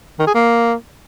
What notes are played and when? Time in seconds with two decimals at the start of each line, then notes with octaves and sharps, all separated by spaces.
0.19 D#3
0.27 G#4
0.35 A#3